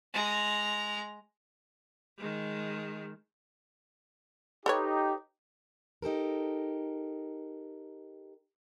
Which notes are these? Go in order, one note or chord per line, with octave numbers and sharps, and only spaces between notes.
G#3 A#5
D#3 G#3
D#4 G4 A4 B4 C#5
D#4 G4 A4 A#4